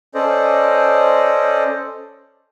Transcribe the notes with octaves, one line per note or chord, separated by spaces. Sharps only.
C#4 A4 C5 D5 D#5